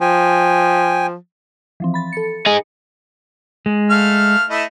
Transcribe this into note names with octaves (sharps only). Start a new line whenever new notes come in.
F3 G5 G#5
E3 F3 C4
B5 A6
A4 C#7
D#4 G#4
G#3
A3 F5 F6
A3 E4 D#5